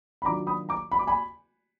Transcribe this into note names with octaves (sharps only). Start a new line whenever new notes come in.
B5
D#3 F#3 D4 F4 A#5 D6
B5 D#6
A#5 D6
B5
D6
G#5 B5